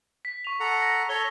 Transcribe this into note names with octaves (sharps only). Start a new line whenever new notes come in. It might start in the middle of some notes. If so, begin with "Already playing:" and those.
B6
C#6 F7
A4 F#5 A#5
A#6
A4 C#5 G7